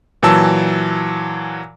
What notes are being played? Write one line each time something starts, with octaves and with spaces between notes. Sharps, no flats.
A#2 E3 F#3 A5 E6